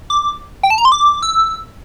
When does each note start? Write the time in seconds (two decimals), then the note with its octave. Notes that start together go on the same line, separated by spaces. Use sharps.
0.10 D6
0.63 G5
0.70 A5
0.78 A#5
0.85 C6
0.92 D6
1.23 E6